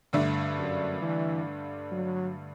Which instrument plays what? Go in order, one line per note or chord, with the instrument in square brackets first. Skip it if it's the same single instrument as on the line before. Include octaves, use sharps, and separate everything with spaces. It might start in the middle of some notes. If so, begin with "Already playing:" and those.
[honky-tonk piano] G2 D3 A3 D4
[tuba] F#2
E3
F#3